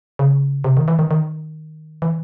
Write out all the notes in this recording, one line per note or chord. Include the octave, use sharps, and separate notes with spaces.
C#3
C3
D#3
E3
D#3
D#3
E3